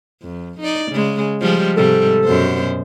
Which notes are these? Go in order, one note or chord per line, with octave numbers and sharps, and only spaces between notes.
F2
D#4 D5
C#3 G#3
F3 G3 G#3
G#2 C3 G3 A4
F#2 B2 C5